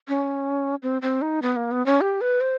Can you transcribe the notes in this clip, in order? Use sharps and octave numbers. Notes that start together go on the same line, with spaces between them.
C#4
C4
C4
D#4
B3
A#3
B3
C#4
G4
B4
C5